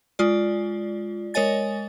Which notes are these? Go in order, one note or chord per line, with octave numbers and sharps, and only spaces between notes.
G#3 F4 D5
G#3 A#4 C#5 D#5 G#5 A6